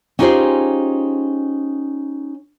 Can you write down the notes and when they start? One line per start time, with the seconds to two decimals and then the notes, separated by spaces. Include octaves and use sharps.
0.19 C#4 D#4 F4 G4 G#4 C5